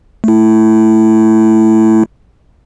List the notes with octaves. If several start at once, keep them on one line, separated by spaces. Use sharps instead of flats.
A3 E4